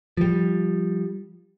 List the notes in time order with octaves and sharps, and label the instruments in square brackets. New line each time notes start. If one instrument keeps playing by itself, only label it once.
[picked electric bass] F3 G3